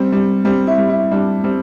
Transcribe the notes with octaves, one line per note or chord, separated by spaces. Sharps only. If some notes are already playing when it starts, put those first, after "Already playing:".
Already playing: G3 C4
G3
G3 C4
E4
G3
E4
G3 D4
G3 C4